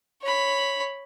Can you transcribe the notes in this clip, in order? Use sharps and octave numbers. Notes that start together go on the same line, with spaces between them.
C#5 B5